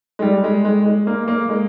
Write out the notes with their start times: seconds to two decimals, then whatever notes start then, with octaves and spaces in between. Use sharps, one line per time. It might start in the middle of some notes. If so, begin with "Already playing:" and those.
0.19 G#3
0.22 G3
0.44 G#3
0.65 G#3
0.86 G#3
1.07 A#3
1.28 A#3
1.49 G#3